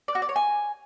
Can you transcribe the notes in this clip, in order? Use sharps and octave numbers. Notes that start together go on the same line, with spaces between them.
D5
F#4
D5
C#5
G#5